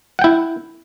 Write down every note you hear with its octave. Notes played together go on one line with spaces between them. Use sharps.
E4 F#5 G5